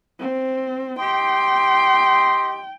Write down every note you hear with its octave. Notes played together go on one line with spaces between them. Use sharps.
C4
G4 D#5 G5 C6